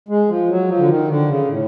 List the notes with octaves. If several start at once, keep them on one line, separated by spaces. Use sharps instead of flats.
G#3
F3
F#3
F3
D3
D#3
D3
C#3
A2